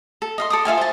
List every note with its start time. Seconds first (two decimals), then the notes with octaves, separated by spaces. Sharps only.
0.22 A4
0.38 D#5 F5 C6
0.50 A4 D6 D#6
0.65 F4 E5 F5 G#5
0.78 C5 A5